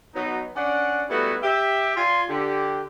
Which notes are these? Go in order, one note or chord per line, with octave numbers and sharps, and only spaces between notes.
F#3 B3 D#4
C#4 D4 D5 F#5
G3 A3 B3 D#4 E4 F#4
G4 E5
F4 D5 G#5 C6
D3 G4